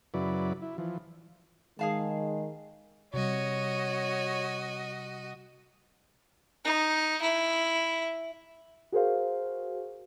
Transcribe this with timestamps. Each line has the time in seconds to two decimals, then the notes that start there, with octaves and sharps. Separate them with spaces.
0.14 F#2 C#3 F#3 E4 B4 D5
0.62 E4
0.78 E3 F3
1.79 D#3 G#3 G#4 F5 A5
3.14 C3 G3 F#4 C#5 D#5
6.65 D#4
7.22 E4
8.92 F#4 G#4 A#4 C5 F5